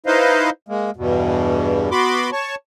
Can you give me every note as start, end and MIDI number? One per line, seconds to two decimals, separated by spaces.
0.06 0.50 63
0.06 0.50 64
0.06 0.50 71
0.06 0.50 72
0.06 0.50 75
0.06 0.50 77
0.69 0.90 56
0.69 0.90 58
0.97 1.90 40
0.97 1.90 43
0.97 1.90 47
1.91 2.30 59
1.91 2.30 66
1.91 2.30 83
1.91 2.30 84
1.91 2.30 86
2.33 2.55 73
2.33 2.55 81
2.33 2.55 85